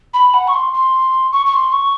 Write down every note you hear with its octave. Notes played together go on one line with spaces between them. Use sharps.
B5
F#5
C#6
C6
C6
C#6
C#6
C6
C#6